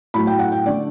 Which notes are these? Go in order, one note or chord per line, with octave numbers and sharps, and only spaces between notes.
A2 F#3 A3 B5
G5
F#5
G5
D3 A3 D5